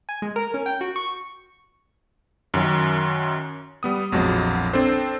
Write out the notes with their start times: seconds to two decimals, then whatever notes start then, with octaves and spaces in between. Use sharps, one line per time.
0.09 G#5
0.22 G#3
0.36 A#4
0.54 C#4
0.66 G5
0.81 F#4
0.96 C#6
2.54 F#2 D#3 F#3
3.83 G3 B3 D#6
4.12 A#1 F2 B2 F#3 G#3
4.73 C4 D4 A4 C5